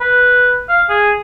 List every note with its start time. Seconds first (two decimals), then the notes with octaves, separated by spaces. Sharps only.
0.01 B4
0.69 F5
0.90 G#4